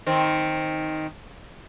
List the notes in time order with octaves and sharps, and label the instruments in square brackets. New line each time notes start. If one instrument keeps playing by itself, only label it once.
[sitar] D#3 C4